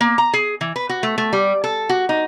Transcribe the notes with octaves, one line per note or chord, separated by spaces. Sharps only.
A#3
A#5
G#4
E3
B4
F#4
A3
A3
G3
A4
F#4
D#4